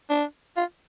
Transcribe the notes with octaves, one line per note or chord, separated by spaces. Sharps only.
D4
F4